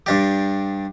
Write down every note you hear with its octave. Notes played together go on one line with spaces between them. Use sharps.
G2 D4 G4